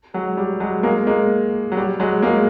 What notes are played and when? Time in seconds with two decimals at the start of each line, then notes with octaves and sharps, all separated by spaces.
0.14 F#3 G#3
0.37 G3
0.60 F#3 G#3
0.83 G#3 A#3
1.07 G#3 A#3
1.72 F#3
1.77 G3
2.00 F#3 G#3
2.22 G#3 A#3